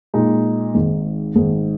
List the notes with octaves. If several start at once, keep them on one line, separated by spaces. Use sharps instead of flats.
A#2 G#3 D#4
G#1 G#2 D#3
G#1 G#2 D#3